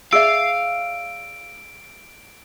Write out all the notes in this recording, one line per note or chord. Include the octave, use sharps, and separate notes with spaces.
G#4 D5 E5 F5 E6 D7